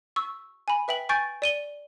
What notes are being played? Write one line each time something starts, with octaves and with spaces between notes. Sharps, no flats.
C#6 E6
G#5 B5
B4 E5 G5 F#7
G#5 C#6 G6 A6 D7
D5 D#7 G7